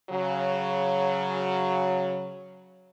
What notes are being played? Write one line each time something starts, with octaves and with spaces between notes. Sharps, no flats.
C#3 F#3